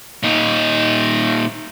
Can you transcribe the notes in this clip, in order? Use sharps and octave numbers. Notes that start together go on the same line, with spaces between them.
A#2 D#4